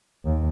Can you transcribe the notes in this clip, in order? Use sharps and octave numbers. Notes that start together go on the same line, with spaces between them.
D#2